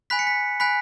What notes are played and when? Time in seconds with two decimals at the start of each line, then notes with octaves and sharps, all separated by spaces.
0.10 G#5 B5 F#6 B6
0.19 C#7
0.27 B6
0.60 G#5 B5 F#6 B6